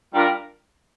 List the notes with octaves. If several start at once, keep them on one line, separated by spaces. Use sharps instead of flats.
G3 D4 F4 A#4